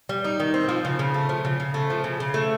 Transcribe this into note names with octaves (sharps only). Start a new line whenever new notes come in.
G3
D#4
D#3
C4
F3
C#3
C#3
A3
F3
C#3
C#3
A3
F3
C#3
C#3
A3